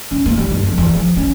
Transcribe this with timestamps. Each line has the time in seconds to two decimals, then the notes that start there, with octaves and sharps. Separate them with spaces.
0.11 C#4
0.26 A#3
0.37 G3
0.51 G1
0.63 F2
0.78 E2
0.96 F3
1.17 C#4